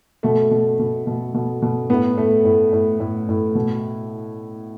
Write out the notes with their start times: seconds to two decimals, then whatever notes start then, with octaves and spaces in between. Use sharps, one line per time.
0.23 B2 A3
0.51 B2
0.79 B2
1.07 B2
1.34 B2
1.62 B2
1.89 A2 B3
2.17 A2 A3
2.45 A2
2.73 A2
3.00 A2
3.29 A2
3.55 B2